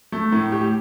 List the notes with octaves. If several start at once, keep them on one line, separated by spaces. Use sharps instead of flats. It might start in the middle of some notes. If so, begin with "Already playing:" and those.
A3
A2
G4